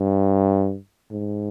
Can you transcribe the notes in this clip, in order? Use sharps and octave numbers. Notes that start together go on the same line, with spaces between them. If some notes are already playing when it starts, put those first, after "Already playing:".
Already playing: G2
G#2